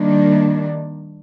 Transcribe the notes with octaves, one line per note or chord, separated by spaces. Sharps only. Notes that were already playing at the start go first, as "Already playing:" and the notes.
Already playing: D#3 G3 A#3 D4